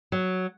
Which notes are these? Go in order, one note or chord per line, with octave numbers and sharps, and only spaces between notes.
F#3